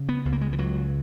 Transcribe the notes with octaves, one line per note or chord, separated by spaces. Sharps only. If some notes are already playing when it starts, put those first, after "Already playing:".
Already playing: C#3
B3
C#2
A#3
G#3
E3
C#2 F#3